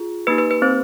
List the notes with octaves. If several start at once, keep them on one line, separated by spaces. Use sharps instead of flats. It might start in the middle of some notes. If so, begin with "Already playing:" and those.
Already playing: F4 G#4
A#3 D#4 G4 B4
B4
B4
C4 C5